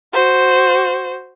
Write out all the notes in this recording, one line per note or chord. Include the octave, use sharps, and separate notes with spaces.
F#4 C5